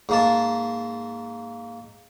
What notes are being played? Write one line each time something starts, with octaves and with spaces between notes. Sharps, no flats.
G#2 A#3 A5